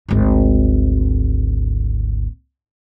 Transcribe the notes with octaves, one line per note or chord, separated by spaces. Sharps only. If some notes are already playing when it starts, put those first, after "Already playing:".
G#1 D2